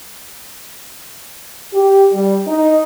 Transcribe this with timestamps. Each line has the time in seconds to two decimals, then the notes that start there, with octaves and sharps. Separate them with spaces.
1.74 G4
2.13 G3
2.47 D#4